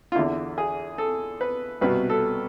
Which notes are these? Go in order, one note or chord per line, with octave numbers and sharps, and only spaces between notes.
F4
E2 D3 E4
G#4
A4
B4
C2 B2 B4
A4